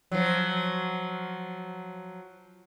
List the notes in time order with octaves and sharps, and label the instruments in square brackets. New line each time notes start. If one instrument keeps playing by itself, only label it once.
[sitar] F3 F#3